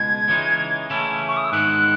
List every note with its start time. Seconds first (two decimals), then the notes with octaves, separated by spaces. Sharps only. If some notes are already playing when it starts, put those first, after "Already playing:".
Already playing: C#2 B2 G#3 G#6
0.28 C#3 E3 G#3 D#4
0.90 C#3 E3 A3 C#4 E4
1.28 C#6
1.37 D#6
1.45 E6
1.52 G#2 D#3 G#3 B3 E4 F#6